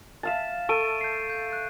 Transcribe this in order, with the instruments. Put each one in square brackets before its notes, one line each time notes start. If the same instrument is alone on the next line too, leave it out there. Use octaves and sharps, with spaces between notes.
[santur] E5 F5 A5 [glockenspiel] A6 E7
[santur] A4 [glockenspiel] C#6 D7 D#7
[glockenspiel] G6 C7
G6
F#6